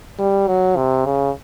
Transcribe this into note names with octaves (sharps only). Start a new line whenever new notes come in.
G3
F#3
C3
C#3